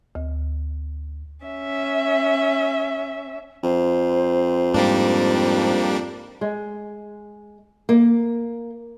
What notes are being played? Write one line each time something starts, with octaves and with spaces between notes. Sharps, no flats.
D2
C#4 E5
F2 C5
G#2 G3 A#3 D4
G#3
A#3